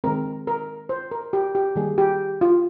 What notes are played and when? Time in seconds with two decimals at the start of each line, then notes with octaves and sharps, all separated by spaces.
0.04 D#3 G#3 C4 A#4
0.47 A#4
0.89 C5
1.11 A#4
1.33 G4
1.55 G4
1.76 D#3 G3 A#3 G#4
1.98 G4
2.41 F4